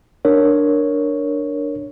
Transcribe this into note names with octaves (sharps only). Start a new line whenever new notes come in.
D4 A#4 C#5